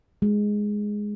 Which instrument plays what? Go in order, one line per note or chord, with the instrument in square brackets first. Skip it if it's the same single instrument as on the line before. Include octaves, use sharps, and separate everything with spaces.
[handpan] G#3